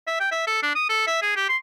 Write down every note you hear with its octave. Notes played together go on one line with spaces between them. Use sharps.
E5
G5
E5
A4
D4
D#6
A4
E5
G#4
G4
C6